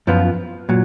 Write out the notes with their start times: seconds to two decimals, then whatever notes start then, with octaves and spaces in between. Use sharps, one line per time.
0.07 F#2 F3 B3 F4
0.69 A#2 F#3